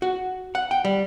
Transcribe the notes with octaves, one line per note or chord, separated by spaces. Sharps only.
F#4
F#5
G5
G3